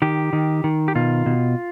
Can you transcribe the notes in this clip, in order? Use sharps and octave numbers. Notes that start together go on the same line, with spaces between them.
D#3 G4
D#3
D#3
G4
B2 F4
B2